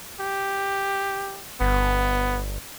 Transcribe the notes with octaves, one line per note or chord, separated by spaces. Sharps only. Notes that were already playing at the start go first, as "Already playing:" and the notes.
G4
G1 B3